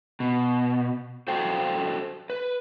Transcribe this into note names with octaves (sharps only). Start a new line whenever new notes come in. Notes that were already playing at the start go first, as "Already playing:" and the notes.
B2
F#4 A4 C5 G5
B4